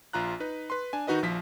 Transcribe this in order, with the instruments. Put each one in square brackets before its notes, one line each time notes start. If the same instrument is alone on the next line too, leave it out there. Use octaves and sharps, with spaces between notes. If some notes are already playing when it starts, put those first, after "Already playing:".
[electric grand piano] A#1 F4 A#5 F#6
D#4 B4
B4 C6
D4 G#5
D#3 D#4 F#4 B4 D#5
A#1 F3 B6